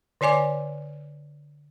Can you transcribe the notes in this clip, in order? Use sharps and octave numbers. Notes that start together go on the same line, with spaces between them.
D3 C#5 D5 G#5 D6